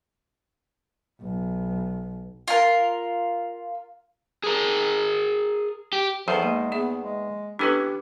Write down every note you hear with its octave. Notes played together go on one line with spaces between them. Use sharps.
B1
F4 A#4
G#4 A#4
G4
E2 D#3 F3 A4 C5
G#3 A#3
B3 G#4 E5
G#3
E3 B3 C#4 D4 G4 A4 B4